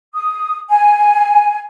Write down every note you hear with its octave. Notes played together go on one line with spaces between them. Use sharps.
D#6
G#5